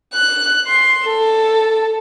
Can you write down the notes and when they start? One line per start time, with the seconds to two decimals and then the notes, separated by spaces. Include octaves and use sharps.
0.14 F#6
0.67 C6
1.07 A4